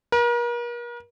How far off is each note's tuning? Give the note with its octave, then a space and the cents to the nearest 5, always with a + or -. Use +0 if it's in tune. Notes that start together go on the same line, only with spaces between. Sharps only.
A#4 +40